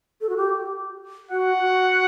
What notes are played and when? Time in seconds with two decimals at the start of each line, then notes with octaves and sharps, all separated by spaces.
0.21 A4
0.29 F#4
0.37 G4
1.31 F#4 F#5
1.62 F#4